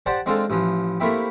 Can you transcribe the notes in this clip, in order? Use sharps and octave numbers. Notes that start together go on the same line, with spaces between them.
G4 C5 D5 F#5 G5 A5
G#3 C4 D4 F4 A4 F5
A1 E3 F3
A3 A#3 C4 E4 G4